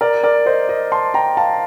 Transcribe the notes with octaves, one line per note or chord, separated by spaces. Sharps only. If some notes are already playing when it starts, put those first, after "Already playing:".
A#4 D5
A#4 D5
C5 D#5
C5 D#5
A5 C6
G5 A#5
F5 A5